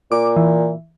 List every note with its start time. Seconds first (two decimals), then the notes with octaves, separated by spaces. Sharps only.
0.12 A#2 D6
0.37 E3